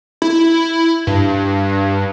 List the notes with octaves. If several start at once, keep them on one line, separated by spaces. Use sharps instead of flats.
E4
G2